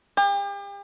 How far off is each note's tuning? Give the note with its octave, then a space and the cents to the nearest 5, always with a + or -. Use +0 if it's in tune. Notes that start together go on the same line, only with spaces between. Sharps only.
G4 +40